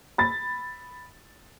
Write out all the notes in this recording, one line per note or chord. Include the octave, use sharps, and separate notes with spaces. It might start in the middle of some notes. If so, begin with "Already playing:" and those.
B5 A6